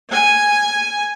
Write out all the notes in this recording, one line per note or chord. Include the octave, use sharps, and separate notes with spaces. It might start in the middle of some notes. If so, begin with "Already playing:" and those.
G#5